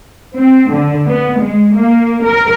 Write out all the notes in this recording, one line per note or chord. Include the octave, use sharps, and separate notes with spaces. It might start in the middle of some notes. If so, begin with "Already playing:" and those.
C4
D3
B3
G#3
A#3
A#4